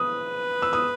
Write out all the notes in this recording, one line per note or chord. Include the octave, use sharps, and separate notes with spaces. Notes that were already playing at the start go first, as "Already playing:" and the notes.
Already playing: B4 D#6
E6
D#6